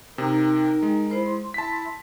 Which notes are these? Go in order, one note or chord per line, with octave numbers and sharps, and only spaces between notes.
C3 D#4 A#4 G5 A#5
G#3
E4 C5 B5
C6
E4 A5 B6